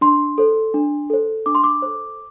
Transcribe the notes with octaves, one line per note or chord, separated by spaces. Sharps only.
D4 C6
A4 C5
D4
A4 C5
D4 D6
C6
D6
A4 C5